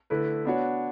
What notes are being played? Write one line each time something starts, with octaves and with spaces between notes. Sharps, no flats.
D3 A3 E4 B4
B3 D4 F#4 C#5